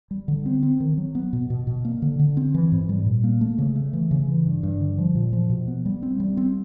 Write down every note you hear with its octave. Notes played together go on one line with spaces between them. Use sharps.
G3
D3
C4
C4
D#3
F#3
B3
B2
B2
B2
A#3
D3
D3
C4
E3
G#2
G3
A#2
A#3
A3
C#3
A3
E3
C#3
E3
G2
G2
D3
F3
A#2
F3
B2
B3
G3
C4
G3
C4